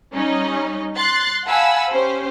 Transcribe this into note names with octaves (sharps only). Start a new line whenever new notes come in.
G3 C#4 D#4 D#5
C6 F#6 A6
F5 F#5 G#5 A5 B5 E6
C#4 G4 C5